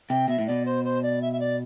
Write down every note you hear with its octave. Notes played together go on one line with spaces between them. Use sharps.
C3 G5
B2 E5
A2
B2 D5
C5
C5
D5
E5
E5
D5